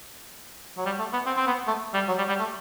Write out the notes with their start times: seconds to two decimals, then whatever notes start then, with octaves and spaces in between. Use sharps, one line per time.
0.77 F#3
0.86 G3
0.99 A3
1.13 B3
1.26 C4
1.37 C4
1.47 B3
1.67 A3
1.94 G3
2.08 F#3
2.18 G3
2.29 G3
2.39 A3